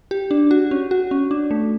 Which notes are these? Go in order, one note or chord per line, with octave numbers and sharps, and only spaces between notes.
G4
D4
F#4
C#4
F#4
C#4
D4
A3